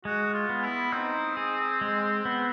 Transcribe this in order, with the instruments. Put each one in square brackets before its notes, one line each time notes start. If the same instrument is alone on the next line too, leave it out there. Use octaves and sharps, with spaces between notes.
[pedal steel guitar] G#3 [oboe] F#4
[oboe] F4
[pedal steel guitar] B3
[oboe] E4
[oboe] C4 [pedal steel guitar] D#4
[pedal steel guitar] G#4
G#3
B3